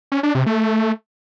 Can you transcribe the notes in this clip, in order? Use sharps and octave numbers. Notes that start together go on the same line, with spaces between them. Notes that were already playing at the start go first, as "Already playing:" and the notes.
C#4
D4
C3
A3